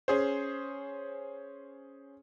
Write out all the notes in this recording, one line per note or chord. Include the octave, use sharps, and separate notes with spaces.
C#4 G#4 C5